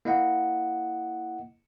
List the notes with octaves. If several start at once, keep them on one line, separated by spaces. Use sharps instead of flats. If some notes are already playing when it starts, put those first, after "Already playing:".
A#3 E4 D#5 F#5